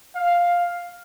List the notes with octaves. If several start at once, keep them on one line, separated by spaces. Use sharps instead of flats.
F5